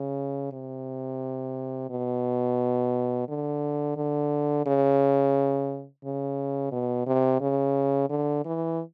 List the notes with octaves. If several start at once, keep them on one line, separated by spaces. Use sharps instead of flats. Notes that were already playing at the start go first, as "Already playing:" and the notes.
Already playing: C#3
C3
B2
D3
D3
C#3
C#3
B2
C3
C#3
D3
E3